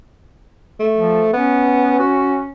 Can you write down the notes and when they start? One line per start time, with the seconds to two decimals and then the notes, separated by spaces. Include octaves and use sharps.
0.80 A3
0.98 F3
1.33 B3 C#4
1.99 F#4